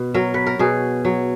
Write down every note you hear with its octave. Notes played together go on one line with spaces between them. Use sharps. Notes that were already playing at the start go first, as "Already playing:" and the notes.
Already playing: B2
F#3 A#4
B4
A#4
B2 G#4
F#3